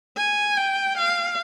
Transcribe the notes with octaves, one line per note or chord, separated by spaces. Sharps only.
G#5
G5
F5